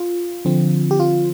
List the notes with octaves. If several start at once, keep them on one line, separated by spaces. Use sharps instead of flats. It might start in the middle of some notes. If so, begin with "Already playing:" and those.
Already playing: F4
D3 F3 C4
G4
F4